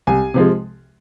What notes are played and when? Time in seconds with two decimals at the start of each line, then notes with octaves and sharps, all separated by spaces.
0.07 C2 G#5
0.34 C3 F3 G#3